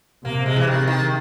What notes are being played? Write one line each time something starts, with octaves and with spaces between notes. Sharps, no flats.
C3 A#3
G#3
E3
D#3
D#3